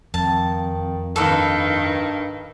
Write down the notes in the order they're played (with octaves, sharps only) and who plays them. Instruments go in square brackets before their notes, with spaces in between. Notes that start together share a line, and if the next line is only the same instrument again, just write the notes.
[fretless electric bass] F2 [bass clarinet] D#3 [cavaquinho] A5
[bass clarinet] G2 [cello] D#3 [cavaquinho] A4 B4 F5